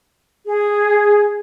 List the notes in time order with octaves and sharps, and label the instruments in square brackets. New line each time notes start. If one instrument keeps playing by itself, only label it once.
[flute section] G#4